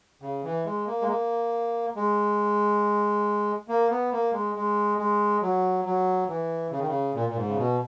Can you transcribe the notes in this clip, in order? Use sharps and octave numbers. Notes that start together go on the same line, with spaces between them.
C#3
E3
G#3
A#3
G#3
A#3
G#3
A#3
B3
A#3
G#3
G#3
G#3
F#3
F#3
E3
C#3
D#3
C#3
A#2
A#2
G#2
C#3
B2